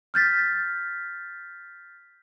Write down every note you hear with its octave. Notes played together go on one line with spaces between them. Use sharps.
F6 G6 A6 B6